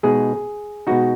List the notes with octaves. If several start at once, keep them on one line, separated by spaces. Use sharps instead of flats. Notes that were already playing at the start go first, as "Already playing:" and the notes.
B2 G#3 B3 D#4 G#4
B2 G#3 B3 D#4 F#4